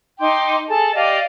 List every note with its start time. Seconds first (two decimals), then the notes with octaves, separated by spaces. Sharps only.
0.20 D#4 G5 C6 D6
0.69 G#4 A4 A5
0.94 G4 D5 D#5 F5